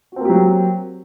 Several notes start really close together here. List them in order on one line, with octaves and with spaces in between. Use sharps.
F#4 C4 A#3 G4 F#3